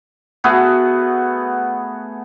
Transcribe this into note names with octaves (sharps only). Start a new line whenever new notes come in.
A3 B3 F#4 G#4